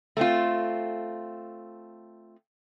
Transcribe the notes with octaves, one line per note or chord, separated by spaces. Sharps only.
A3 C4 F4